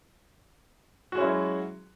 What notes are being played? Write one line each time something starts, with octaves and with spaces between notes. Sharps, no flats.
F#3 G#3 C#4 E4 F#4